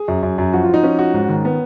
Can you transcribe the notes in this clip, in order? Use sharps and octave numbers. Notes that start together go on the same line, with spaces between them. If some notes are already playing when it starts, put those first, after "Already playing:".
Already playing: G#4
F#2
F#2
F#2
F3 F#4
F4
F3 D#4
F3 C#4
F#4
G#2
D#3
B3